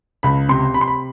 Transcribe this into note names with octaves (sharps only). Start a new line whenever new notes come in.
C#2 B5
C3 C6
C3 B5
C6
B5